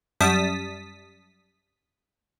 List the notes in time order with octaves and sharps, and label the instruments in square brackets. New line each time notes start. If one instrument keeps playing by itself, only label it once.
[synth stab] F#2 G3 A5 D#6 B6